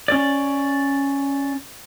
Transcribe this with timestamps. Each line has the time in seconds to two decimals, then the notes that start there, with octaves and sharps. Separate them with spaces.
0.08 C#4 D5